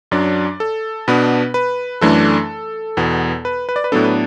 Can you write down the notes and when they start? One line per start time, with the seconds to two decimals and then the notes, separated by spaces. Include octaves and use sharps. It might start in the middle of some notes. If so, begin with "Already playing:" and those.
0.11 F#2 F#3 D4 D5
0.60 A4
1.08 B2 B3 D4 B4
1.54 B4
2.01 F#2 E3 A3 D4 A4
2.97 E2 B2 B3
3.45 B4
3.69 B4
3.76 D5
3.84 B4
3.92 A2 F#3 B3 D4 A4
4.04 B4